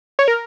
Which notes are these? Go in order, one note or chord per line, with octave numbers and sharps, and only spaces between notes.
C#5
A#4